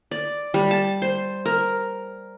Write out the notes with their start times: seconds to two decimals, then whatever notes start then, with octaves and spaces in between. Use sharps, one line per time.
0.11 D5
0.54 G3
0.71 A5
1.02 C5
1.45 A#4